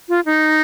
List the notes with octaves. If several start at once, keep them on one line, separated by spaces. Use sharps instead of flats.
F4
D#4